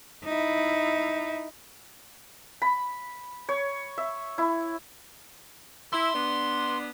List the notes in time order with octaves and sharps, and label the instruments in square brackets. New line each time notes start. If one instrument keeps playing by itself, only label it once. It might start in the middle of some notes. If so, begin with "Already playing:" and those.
[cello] D#4 E4
[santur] B5
C#5
E5
E4
[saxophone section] E4 [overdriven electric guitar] C6
[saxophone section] B3 D4